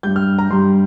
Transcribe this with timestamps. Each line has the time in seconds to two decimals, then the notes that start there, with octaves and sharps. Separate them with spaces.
0.03 G2 G3 G6
0.16 F6
0.39 A#5
0.50 G2 G3 C6